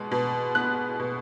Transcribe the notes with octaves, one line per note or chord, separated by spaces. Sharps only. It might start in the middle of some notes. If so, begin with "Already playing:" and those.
Already playing: B2 G#3
B2
B3 F#6
B2